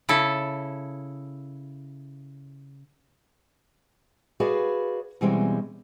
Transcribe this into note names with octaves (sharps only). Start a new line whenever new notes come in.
C#3 E4 A4
F#4 G#4 B4 D5 F5
B2 E3 G3 G#3 C4 C#4